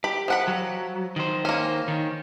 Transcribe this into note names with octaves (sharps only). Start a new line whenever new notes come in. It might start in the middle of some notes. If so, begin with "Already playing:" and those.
G4 B5
F3 F#5 B5
F#3
D#3 C5
A#3 C#4
D#3